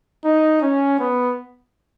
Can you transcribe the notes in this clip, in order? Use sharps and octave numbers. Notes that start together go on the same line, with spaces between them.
D#4
C#4
B3